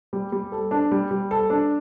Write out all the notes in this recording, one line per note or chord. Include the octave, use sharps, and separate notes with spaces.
G3
G3
A4
D4
G3
G3
A4
D4